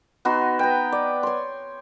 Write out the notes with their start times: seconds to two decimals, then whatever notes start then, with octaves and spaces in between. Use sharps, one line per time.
0.25 B3 D#4 F#4 C6
0.59 B4 G5
0.92 D5
1.23 C#5 C6